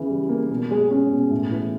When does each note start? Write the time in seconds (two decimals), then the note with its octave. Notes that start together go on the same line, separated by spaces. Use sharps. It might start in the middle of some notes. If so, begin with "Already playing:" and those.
Already playing: C#3 E3
0.09 G3
0.29 A#3
0.50 B2
0.71 G#3
0.90 C#4
1.12 B2
1.31 A2
1.51 E3